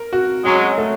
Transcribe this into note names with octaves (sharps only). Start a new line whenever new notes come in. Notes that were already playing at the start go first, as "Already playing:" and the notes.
Already playing: A#4
F#4
F#3 G#3 C#4
A3